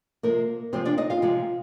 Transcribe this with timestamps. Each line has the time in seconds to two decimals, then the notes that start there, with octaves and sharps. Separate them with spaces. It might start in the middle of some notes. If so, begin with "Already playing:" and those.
0.23 C3 F3 G#3 A#3 A#4
0.73 C3 F3 G#3 C4 C5
0.85 D4 D5
0.98 D#4 D#5
1.10 F4 F5
1.22 C3 F3 G#3